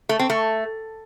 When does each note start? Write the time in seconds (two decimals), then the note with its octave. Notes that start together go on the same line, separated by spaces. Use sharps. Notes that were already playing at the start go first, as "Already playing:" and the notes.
0.09 A3
0.19 C4
0.30 A3